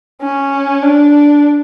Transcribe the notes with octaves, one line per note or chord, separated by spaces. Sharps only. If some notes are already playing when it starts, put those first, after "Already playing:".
C#4
D4